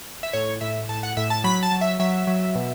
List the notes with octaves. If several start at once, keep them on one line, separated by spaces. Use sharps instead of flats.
E5
A2 C#5
A2 E5
A2 A5
F#5
A2 E5
A5
F#3 B5
A5
F#3
E5
F#3 E5
F#3
B2